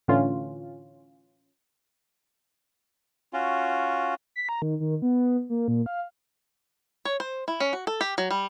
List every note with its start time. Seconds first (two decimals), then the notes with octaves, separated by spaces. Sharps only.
0.08 A2 D3 E3 C#4 F4
3.33 C#4 F4 F#4
4.36 B6
4.49 A#5
4.62 D#3
4.80 D#3
5.02 B3
5.50 A#3
5.68 A#2
5.86 F5
7.05 C#5
7.20 C5
7.48 E4
7.60 C#4
7.73 F#4
7.87 A4
8.01 G4
8.18 F#3
8.31 G3